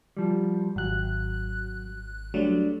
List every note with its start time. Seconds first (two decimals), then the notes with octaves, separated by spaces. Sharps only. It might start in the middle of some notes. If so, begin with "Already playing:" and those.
0.17 F3 G3
0.76 G#1 F#3 F#6
2.34 F#3 G3 A3 D4